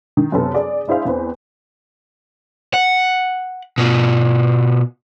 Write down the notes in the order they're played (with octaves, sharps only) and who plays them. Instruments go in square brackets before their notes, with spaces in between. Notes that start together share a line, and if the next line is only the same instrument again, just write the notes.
[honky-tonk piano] D#3
F#2 C3 B3 A4 A5
G#4 D5
D4 E4 G#4 C5 F5
E2 C4 B4 C5
[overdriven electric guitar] F#5
B2 F4